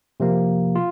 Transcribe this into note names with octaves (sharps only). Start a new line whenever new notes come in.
C3 F3 A#3
F4